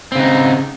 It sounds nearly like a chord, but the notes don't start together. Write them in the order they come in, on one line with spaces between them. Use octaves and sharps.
C4 C#3 D#4